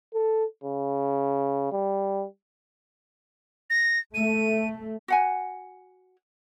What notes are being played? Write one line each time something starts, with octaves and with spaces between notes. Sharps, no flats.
A4
C#3
G3
A#6
A3 D#7
F#4 F#5 G#5